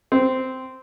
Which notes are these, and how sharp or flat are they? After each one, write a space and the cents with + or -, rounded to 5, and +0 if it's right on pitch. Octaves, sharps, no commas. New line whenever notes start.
C4 -10